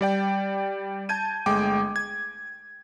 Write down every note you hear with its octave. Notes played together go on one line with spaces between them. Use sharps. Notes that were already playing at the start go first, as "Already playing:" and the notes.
G3 D5 G5
A5 G6 G#6 D#7
G1 G#3 A3 G5 D6
G#6